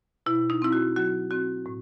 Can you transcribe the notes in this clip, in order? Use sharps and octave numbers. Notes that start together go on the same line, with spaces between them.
B2 E4
D#4
C4 E4
F#4
F#3 F#4
C4 F#4
A2